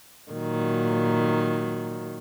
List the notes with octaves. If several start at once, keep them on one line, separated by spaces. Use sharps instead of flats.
A#2 D#3 F#3